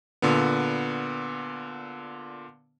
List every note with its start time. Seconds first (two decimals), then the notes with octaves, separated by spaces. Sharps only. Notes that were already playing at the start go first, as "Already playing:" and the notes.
0.22 A#2 D3 B3